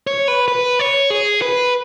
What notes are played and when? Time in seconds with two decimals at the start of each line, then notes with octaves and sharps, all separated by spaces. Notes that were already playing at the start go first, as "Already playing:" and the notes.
0.07 C#5
0.28 B4
0.48 B4
0.79 C#5
1.10 G#4
1.42 B4